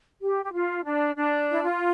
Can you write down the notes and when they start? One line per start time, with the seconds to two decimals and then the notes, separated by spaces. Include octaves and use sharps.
0.20 G4
0.44 G4
0.52 F4
0.83 D4
1.15 D4
1.50 E4
1.62 F4